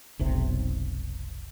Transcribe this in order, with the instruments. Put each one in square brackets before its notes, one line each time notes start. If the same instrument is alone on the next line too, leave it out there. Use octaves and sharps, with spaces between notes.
[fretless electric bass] F1 B1 C3